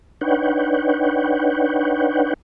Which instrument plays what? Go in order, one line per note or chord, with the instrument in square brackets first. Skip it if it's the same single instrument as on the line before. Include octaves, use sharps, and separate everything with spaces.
[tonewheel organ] D4 D#4 B4 C#5 F#5 G5